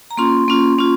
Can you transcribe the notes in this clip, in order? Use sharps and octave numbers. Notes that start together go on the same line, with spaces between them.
A#5
A#3 C#4 F4 C6
A#3 C#4 F4
A#3 C#4 F4